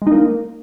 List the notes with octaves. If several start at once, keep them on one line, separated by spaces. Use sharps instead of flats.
G#3
D#4
A#3